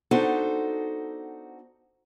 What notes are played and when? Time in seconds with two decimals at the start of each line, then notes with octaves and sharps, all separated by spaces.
0.11 B3 D4 D#4 F#4 A4 C5